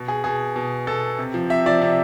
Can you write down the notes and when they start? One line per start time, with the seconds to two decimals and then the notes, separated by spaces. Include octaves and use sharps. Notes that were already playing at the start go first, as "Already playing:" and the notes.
Already playing: B2
0.08 G#4
0.24 B2 G#4
0.56 B2
0.87 B2 A4
1.19 C3
1.34 F3
1.50 C3 E5
1.66 F3 D5
1.82 C3